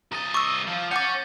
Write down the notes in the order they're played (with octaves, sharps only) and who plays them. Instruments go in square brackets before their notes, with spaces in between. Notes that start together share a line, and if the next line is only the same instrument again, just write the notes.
[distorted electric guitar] C2 D#5 [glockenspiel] A#5 A6
[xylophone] C#6 E6 [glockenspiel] D6
[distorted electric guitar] F3
[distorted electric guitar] C#4 C#5 [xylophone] F#5 D6 [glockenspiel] G6 A6